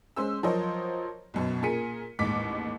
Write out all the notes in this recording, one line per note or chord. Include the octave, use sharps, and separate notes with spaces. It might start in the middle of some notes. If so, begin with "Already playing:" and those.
G#3 C#4 C5 E6
F3 F#3 A#4 C5 C#5 D#5
B1 F#2 B2
A#2 G#4 A#4 B6 C#7 D#7
A1 D#2 G#2 D6 B6